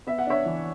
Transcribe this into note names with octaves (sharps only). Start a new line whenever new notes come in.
B3 E5
F#5
D4 C#5 E5
E3